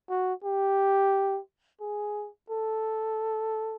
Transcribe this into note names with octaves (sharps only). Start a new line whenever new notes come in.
F#4
G4
G#4
A4